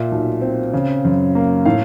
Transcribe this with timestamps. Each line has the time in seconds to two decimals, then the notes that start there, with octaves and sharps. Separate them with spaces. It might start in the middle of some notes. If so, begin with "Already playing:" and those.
Already playing: A#2 E5
0.12 B1
0.42 C4
0.74 C#3
1.05 F#2
1.35 A#3
1.65 A2 F5